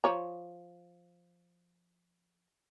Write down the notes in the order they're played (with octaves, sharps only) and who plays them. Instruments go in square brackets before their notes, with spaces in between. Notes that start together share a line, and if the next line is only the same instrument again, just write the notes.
[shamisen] F3 C#5 A#5